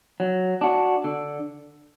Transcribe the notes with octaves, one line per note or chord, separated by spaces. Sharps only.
F#3
D4 F#4
D3